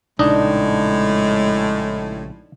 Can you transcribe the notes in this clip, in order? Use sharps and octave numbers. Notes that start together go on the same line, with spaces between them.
A#1 A2 C#3 G#3 D4 D#4 D#5